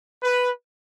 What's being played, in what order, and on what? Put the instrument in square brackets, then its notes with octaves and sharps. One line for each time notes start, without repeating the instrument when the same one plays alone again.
[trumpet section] B4